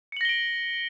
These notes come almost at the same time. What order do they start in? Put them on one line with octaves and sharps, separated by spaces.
C#7 F#7 A#6 G7 D7